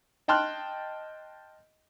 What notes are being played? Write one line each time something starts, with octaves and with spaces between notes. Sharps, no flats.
D#5 G5 A5 C6 F6 F#6